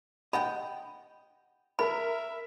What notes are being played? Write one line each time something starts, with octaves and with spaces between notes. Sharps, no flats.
D#5 F#5 G5 B5
A#4 E5 B5